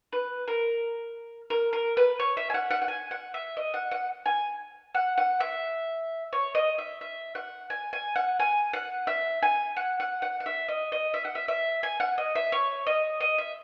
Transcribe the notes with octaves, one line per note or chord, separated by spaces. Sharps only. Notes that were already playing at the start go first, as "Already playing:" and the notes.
B4
A#4
A#4
A#4
B4
C#5
E5
G#5
F#5
F#5
F#5
G#5
F#5
E5
D#5
F#5
F#5
G#5
F#5
F#5
E5
C#5
D#5
E5
E5
F#5
G#5
G#5
F#5
G#5
F#5
E5
G#5
F#5
F#5
F#5
F#5
E5
D#5
D#5
E5
F#5
E5
E5
G#5
F#5
D#5
E5
C#5
D#5
D#5
E5